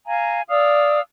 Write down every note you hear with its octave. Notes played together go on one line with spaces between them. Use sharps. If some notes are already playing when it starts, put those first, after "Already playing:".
F5 G#5 A#5
D5 F5 D#6 E6